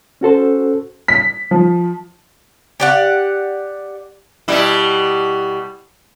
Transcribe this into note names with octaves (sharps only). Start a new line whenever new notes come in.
C#4 F#4 A4 C5
B6
F3
G4 D5 F#5
B2 G3 E4